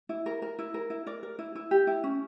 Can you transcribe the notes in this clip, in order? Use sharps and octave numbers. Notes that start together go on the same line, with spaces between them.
E4
A#4
A#4
E4
A#4
E4
A#4 D5
A#4
E4
E4
G4
E4
C#4